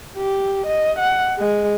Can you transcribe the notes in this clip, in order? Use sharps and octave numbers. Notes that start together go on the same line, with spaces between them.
G4
D#5
F#5
G#3